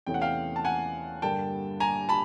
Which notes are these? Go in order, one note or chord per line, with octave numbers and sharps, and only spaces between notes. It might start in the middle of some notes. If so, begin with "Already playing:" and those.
E2 C3 E3 A3 C#4 G5
F#5
F5 G5
A5
F#5 G#5
G2 D3 G3 A#3 D4 G5 A5
G#5 A#5
A5 B5